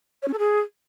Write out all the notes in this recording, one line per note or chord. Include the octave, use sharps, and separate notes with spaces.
C#5
C#4
A4
G#4